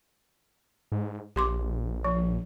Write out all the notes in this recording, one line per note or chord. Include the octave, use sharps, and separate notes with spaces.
G#2
A#1 G4 C6 D6
F3